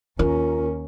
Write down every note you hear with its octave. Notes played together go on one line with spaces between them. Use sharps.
D#2 C#4 F4 A#4